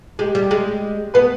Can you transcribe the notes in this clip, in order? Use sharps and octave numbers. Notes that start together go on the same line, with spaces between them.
G#3 G4
G3
G#3
B3 B4